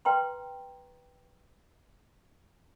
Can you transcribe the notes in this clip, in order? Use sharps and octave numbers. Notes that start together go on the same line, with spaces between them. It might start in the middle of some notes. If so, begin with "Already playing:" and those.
B4 G5 A#5 C6